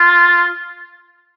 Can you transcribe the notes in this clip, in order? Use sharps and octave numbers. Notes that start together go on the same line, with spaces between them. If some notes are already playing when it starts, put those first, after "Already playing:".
Already playing: F4